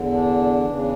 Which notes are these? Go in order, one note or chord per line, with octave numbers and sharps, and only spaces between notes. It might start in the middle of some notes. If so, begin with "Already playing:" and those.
Already playing: E2 D3
D4
E2 C#3 E3